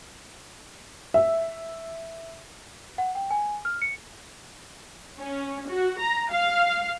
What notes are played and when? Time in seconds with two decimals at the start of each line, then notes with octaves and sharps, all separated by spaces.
1.14 E5
2.98 F#5
3.15 G5
3.31 G#5
3.65 F6
3.82 C#7
5.20 C#4
5.69 F#4
6.00 A#5
6.31 F5